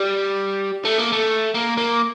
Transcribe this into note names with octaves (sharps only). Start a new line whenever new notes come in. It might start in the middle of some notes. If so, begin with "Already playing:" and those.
Already playing: G3
A3
A#3
A3
A#3
A#3